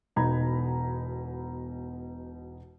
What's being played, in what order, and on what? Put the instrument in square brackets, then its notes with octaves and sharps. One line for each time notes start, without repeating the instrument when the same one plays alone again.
[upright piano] E1 B2 D#4 A#5 B5 G#6